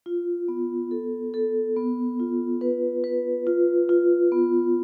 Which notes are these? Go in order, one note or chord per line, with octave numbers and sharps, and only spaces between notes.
F4
B3
A4
A4
B3
F4
B4
B4
F4
F4
B3